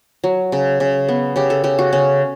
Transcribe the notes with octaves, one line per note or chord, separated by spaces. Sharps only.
F#3
C#3
C#3
B3
C#3 G4
A4
C#3 G4
F#4
C#3 C#4